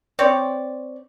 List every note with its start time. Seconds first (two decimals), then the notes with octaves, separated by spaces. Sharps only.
0.19 C4 C#5 D5